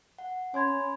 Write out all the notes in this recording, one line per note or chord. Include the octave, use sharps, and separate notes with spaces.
F#5
C#4 C#5 G#5 B5 C6 G#6